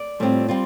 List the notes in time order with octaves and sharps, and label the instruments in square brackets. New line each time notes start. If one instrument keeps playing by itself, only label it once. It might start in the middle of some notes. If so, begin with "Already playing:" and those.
Already playing: [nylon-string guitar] D5
A2 G3 C4 F4
G3 C4 F4